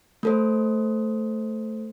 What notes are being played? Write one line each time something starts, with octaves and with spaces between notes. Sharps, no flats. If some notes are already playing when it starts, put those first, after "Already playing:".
A3 A4 C5